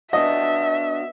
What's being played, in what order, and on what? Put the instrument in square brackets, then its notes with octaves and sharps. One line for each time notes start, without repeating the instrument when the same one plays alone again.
[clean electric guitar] B3 D4 F#4 [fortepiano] D#5 [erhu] E5